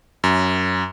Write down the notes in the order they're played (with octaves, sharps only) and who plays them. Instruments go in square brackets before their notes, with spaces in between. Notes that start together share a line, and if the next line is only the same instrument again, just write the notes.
[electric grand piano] F#2